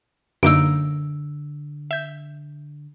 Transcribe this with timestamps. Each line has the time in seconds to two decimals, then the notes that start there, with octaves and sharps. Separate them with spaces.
0.43 F#2 D3 A#3 D#4 E6 D7
1.91 E5 G6